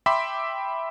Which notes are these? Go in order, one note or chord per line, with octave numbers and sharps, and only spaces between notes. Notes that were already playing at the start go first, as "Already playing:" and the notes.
E5 G5 B5 C6 D6 B6